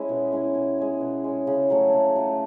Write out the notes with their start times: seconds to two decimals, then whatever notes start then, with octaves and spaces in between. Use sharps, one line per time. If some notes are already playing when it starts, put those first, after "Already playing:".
Already playing: G#3 C#4 E4
0.09 B2
0.32 G#3 C#4 E4
0.55 B2
0.78 G#3 C#4
1.01 B2
1.24 G#3 C#4
1.47 C#3
1.70 F#3 A3
1.93 C#3
2.16 F#3 A3